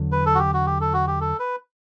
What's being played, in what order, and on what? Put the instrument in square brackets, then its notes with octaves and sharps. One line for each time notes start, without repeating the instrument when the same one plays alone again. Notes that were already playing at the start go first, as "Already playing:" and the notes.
Already playing: [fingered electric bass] E2 D3 F#3
[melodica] B4
A4
F#4
G4
F#4
G4
A4
F#4
G4
A4
B4